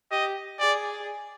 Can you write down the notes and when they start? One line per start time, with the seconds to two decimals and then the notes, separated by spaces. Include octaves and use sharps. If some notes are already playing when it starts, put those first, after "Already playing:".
0.11 G4 D#5
0.59 G#4 D5